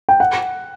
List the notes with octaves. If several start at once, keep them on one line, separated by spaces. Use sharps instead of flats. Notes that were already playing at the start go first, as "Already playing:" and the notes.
G5
F#5